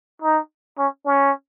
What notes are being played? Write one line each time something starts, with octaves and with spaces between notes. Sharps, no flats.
D#4
C#4
C#4